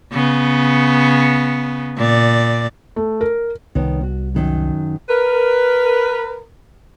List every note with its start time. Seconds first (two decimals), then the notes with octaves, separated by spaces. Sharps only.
0.13 C#3 B3
1.97 A#2 D5
2.96 A3
3.21 A#4
3.75 C2 D#3 G3 B3 C#5
4.03 F#4
4.34 F#2 D#3 F#3
5.09 A#4 B4